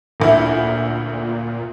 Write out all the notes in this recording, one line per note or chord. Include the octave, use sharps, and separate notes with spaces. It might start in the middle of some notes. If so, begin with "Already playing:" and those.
D#1 D2 A#2 E4